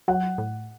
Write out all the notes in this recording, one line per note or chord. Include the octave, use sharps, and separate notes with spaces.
F#3 F#5
A2